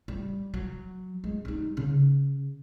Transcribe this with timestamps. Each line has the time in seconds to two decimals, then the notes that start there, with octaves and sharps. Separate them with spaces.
0.08 G3
0.54 F#3
1.24 G#3
1.45 G3 D#4
1.77 C#3